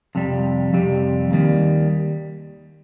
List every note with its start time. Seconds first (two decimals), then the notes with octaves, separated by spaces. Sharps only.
0.15 F2 C3 G3
0.73 F2 C3 G3
1.31 D#2 D#3 G3